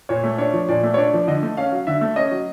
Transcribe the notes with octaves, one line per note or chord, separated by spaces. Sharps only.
A#2 C#5
A3
D4 C#5
F3
A#2 D5
A3
C#5
D4 D5
F3
D3 D#5
A3
C#4 F5
F#3
D3 E5
A3
C#4 D#5
F#3